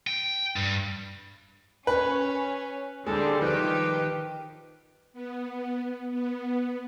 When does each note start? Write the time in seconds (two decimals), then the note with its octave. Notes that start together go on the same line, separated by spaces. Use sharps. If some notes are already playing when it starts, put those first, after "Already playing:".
0.07 G5
0.56 G2
1.87 C#4 B4
3.07 D3 G3 G#3 C4 A4
3.41 D#3 F3 G4 B4
5.13 B3
6.11 B3